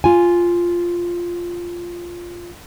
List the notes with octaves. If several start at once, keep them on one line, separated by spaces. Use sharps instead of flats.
F4 G#5